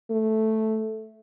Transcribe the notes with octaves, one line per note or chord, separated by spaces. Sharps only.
A3